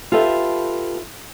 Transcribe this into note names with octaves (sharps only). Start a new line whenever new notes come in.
F4 G4 A4 B4 E5